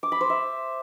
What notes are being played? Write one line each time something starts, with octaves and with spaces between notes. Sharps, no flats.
D6
B5
C5
E5